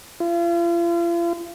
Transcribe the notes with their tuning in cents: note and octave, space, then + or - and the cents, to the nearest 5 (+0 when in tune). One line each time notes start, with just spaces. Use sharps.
F4 -40